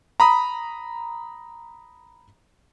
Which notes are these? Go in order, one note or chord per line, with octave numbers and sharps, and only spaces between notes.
A#5 B5 D#6